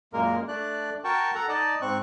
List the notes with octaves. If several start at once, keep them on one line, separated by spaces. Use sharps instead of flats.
F#2 A#2 G#3 A#3 A#4
A3 D4 D5 F#6
F#4 A#4 G5 A5 C#6
A4 F#5 A#5
D#4 D5 D#5 A5
G#2 C4 C#6 F#6